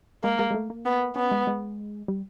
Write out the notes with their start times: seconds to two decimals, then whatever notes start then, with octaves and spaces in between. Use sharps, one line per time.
0.24 G#3 A#3
0.39 G#3
0.51 G#3
0.54 A3
0.70 A#3
0.85 B3
1.16 B3 C#4
1.31 G#3
1.47 G#3
2.08 G3